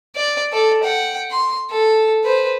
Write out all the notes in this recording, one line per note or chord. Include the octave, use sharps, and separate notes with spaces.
D5
A4 D5
F#5 G5
C6
A4
B4 C5